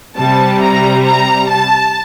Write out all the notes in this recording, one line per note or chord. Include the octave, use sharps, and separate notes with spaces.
C3 G3 A5
A#5
A#5
A5